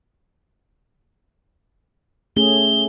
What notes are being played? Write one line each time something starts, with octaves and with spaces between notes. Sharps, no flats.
A3 C#4 G#4 G7